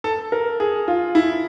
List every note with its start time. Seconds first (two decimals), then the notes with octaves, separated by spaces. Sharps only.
0.04 A4
0.32 A#4
0.60 G#4
0.88 F4
1.15 E4